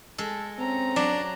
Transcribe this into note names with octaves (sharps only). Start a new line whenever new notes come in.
G#3 A4
C4 C#4 A#5
F#3 D4